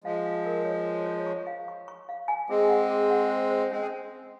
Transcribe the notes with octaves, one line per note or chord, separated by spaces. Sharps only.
F3 G#3 F5
F5
A#4
C#5
C#5
C#5
C#6
F5
C#6
C#6
F5
G#5
G#3 C4 G#4
F#5
G#4
F#5
C5
C5
G#3 C4 C#4
G#4